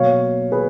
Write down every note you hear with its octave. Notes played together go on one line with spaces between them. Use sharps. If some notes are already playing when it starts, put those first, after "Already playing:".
Already playing: B2 F#3 A#3 C#5 F5
G#4 B4